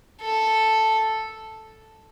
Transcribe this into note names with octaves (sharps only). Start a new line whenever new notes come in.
A4